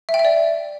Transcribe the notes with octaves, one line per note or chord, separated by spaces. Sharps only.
E5
G5
E5
D5